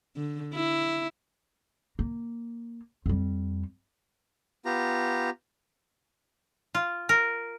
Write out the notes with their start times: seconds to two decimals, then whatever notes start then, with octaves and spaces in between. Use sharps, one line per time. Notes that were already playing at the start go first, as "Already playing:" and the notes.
0.16 D3
0.54 E4
1.99 A#3
3.06 F2 G3
4.65 B3 F4 G4 A#5
6.75 F4
7.09 A#4